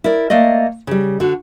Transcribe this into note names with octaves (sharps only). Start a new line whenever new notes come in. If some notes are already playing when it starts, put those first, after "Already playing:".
E4 A#4 D5
A3 A#3 D5 D#5
C#3 G3
D3 F#4